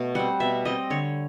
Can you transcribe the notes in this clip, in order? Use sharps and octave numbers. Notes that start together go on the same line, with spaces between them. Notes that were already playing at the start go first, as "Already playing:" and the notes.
Already playing: B2 A3
G3 C4 F#5
B2 E5
G3 C4 D#5
D3 C#5